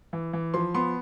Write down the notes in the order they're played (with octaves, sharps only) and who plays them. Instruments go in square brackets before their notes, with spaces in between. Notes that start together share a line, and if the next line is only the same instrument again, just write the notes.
[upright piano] E3
E3
F3 C6
B3 C6